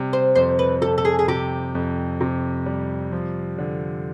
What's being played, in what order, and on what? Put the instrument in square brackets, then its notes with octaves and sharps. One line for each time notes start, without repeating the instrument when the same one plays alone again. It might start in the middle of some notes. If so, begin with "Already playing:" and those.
Already playing: [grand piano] C3 G3
[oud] C5
[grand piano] F2 [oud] C5
[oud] B4
[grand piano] C3 [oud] A4
[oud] A4
G#4
G#4
[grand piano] C3 [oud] G4
[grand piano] F2
C3
G3
F3
D3